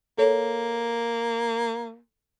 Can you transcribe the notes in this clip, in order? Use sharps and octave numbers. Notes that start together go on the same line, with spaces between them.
A#3 A4 C#5